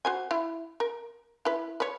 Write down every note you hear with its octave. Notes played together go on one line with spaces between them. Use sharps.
F#4 C5 G#5
E4
A#4
E4 B4
B4 C#5